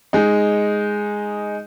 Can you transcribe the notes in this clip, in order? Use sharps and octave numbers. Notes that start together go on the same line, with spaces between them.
G#3 D#4